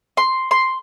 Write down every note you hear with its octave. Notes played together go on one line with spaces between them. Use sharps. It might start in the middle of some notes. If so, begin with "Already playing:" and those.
C6
C6